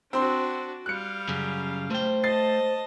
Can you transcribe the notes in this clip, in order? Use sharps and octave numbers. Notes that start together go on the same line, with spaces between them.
C4 D4 F#4 C6
G3 F5 F#6 C#7
F#2 C#3
A3 C5 G5
D#5 A5 A6 C7